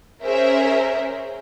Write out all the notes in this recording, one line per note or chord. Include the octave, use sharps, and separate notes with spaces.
C#4 G#4 A#4 C5 E5